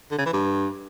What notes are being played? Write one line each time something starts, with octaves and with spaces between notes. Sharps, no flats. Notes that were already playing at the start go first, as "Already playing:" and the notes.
D3
C#3
E3
G2